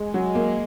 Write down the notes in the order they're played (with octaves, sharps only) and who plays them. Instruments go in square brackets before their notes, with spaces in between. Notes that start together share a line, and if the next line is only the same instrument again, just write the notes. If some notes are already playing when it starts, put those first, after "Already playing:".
Already playing: [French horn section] G#3
[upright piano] F#3
A#3